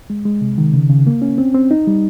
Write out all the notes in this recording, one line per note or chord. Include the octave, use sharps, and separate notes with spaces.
G#3
G#3
C3
D#3
C#3
C#3
A#3
C#4
C4
C4
D#4
G3